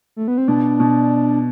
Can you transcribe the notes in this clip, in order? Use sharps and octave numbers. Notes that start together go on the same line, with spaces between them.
A3
B3
C4
B2 D4
B2